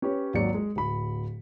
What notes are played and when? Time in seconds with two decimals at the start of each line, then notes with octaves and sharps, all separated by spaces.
0.02 C#4 G4 B4 C#5
0.34 G#1 D#2 F#3 D5 C#7
0.54 G#3
0.76 D1 B5